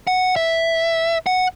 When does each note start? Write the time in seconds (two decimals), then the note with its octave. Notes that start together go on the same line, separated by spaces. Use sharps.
0.07 F#5
0.36 E5
1.26 F#5